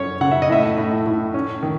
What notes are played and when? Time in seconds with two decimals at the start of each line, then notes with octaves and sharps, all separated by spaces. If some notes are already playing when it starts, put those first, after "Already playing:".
Already playing: F#2 C#4 C#5
0.21 C#3 F#5
0.31 E5
0.42 D#5
0.50 A2 E5
0.77 A2
1.06 A2
1.34 C#4
1.63 D#3